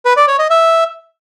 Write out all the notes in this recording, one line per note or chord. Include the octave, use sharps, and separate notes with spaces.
B4
D5
C#5
D#5
E5